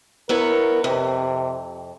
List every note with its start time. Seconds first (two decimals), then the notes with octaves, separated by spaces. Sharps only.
0.29 B3 E4 A#4 C#5
0.84 F2 C3